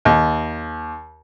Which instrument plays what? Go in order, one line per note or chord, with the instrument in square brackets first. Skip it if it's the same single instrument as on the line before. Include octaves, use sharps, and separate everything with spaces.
[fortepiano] D#2